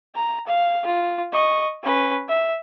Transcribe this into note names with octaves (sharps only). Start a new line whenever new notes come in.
A#5
F5
F4
D#5 C#6
C#4 B4
E5